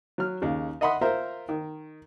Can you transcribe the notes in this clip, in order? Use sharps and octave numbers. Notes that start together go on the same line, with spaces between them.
F#3 F6
D#2 C#3
D#5 E5 F#5 B5 C6 D#6
F4 A#4 C5 E5 A#5
D#3